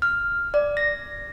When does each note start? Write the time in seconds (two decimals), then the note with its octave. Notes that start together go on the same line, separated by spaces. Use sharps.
0.02 F6
0.54 D5
0.77 A#6